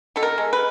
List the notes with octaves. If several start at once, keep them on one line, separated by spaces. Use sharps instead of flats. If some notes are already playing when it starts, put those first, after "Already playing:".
B2 A4
A#4
G#3
B4